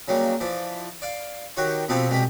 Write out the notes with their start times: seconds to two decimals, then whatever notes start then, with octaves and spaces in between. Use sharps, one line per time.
0.08 C#3 F#3 G3 A#3
0.40 E3 F3 D5
1.02 D5 F5
1.57 D#3 F#4 G4 C#5 C#6
1.89 B2 F3 B3 C4 G4 A4
2.09 C2 B2 G#3 G4 B5